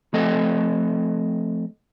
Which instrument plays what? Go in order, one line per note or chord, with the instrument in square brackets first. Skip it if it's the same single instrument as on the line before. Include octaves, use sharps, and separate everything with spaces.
[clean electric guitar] F3 A3 C4 A4 D#5